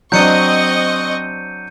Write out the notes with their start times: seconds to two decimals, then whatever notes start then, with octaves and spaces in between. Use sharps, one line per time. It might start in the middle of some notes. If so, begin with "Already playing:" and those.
0.12 F#3 C4 D4 D#5 C#6 G6 C#7 D#7